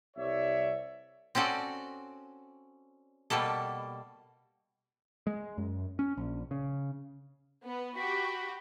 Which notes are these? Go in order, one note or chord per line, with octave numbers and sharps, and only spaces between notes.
C2 C#5 D5 E5
C4 C#4 F#4 A4 D5
B2 G3 A#3 A4
G#3
F#2
C#4
A#1
C#3
B3
F#4 G4 B5